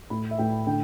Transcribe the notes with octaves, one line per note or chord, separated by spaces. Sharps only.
A2 B5
E5
A2 G5
D3 G5